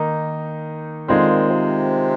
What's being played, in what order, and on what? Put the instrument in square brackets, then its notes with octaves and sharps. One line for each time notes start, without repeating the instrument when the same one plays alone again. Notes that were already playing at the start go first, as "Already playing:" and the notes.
Already playing: [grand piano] D#3 A#3 D#4
[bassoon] D3 [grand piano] D#3 G#3 C4 F4
[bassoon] A#2
C3